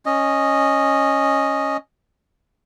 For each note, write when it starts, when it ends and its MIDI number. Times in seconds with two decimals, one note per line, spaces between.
0.06 1.77 61
0.06 1.77 75